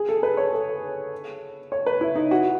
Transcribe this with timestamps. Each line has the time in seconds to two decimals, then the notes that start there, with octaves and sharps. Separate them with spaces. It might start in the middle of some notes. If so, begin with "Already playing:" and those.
Already playing: G#4
0.09 A4
0.23 B4
0.37 C#5
0.53 A4
1.72 C#5
1.86 B4
2.01 E4
2.15 D#4
2.31 F#4